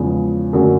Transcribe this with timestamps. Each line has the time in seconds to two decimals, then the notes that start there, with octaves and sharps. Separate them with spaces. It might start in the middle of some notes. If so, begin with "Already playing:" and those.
Already playing: E2 C#3 F3 G#3
0.53 F#2 D3 F#3 A3